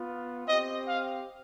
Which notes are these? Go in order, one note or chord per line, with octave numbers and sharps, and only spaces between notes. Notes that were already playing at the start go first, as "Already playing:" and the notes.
Already playing: B3 F4
C4 G4 D#5
F5